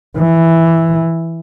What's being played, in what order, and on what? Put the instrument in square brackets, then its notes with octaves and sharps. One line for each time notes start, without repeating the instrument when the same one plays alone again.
[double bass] E3